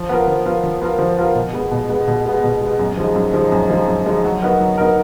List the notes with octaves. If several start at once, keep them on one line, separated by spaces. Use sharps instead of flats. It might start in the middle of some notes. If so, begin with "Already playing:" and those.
Already playing: F3
B3 F4 A#4
F3
B3 F4 A#4
F3
B3 F4 A#4
F3
B3 F4 A#4
B2
G#3 B3
B2
G#3 B3
B2
G#3 B3
B2
G#3 B3
F#2
F3 G#3 D#4
F#2
F3 G#3 D#4
F#2
F3 G#3 D#4
F#2
F3 G#3 D#4
F#3
B3 D#4 F#4 A#4
F#3
B3 D#4 F#4 A#4